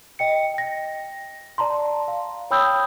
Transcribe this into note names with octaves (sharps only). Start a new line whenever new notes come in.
D#5 G5 C#7
G5 A#6
D5 A5 A#5 C6
F5
C#5 G5 B5 D#6 E6 G6